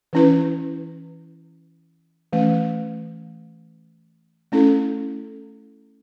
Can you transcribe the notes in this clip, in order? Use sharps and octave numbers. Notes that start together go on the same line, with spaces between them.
E3 C#4 E4 B4
E3 A3 C#4
A3 C#4 E4 A4